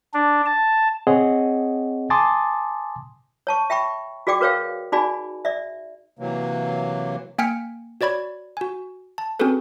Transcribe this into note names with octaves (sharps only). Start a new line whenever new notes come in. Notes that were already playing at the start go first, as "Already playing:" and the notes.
D4
A5
C4 G#4 C#5 D#5 F#5
G#5 A5 C6 D6 D#6 A6
C#5 A5 C#6
E5 G5 B5 C#6
F#4 G#4 D5 G5 D6
F#4 A#4 B4 C#5 F5 G5
D#4 F#4 G#4 D5 G#5 B5
D5 E5
C3 E3 F#3 A#3
A#3 G5 G#5 F6 B6 C#7
F#4 C#5 D5 B5 G#6
F#4 G#5
A5
C4 C#4 F#4 G#4 A4 B4